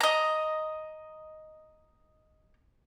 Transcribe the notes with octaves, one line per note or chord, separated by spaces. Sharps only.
D#5 A#5